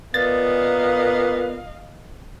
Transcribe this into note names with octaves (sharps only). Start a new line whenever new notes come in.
A#2 B3 D#5 F5 A6